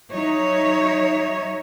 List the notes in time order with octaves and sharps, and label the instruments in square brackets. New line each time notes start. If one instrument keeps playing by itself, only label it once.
[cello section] F#3 D#4 C#5 E5